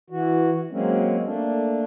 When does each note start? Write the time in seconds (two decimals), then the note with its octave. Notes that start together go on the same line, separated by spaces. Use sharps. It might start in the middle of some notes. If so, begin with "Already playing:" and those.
0.10 E3 F#4
0.71 F#3 G#3 A#3 C4 C#4
1.24 A3 A#3 D4